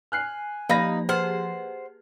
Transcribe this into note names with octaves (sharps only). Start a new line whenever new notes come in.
G#5 F6 F#6 C7
F3 A#3 D#4 G4 F5 B5 A#6
G4 G#4 B4 C5 F#5 F6